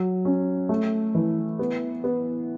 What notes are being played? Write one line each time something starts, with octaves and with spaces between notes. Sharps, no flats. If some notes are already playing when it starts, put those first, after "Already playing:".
Already playing: F#3
C#4
A3
E3
B3
B3